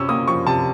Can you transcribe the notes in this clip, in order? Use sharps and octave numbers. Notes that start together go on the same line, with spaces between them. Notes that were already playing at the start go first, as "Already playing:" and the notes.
Already playing: C3 C#4 E6
A#3 D#6
F3 C#6
C3 A5